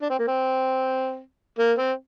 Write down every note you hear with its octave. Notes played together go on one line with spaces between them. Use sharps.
D4
C4
A#3
C4
A#3
C4